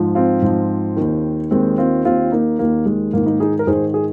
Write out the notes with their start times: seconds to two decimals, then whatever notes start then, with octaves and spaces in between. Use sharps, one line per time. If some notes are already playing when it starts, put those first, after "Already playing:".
Already playing: G#2 F3
0.15 C4 F4
0.42 G#2 F3
0.97 D#2 D#3
1.51 D#2 D#3 G#3 C4
1.78 C4 F4
2.05 D#2 D#3 C4 F4
2.32 A#3 D#4
2.59 D#2 D#3 A#3
2.86 G#3
3.13 G#2 D#3 A#3
3.26 A#3 D#4
3.40 D#4 G#4
3.59 A#4
3.67 G#2 D#3 G#4 C5
3.94 G#4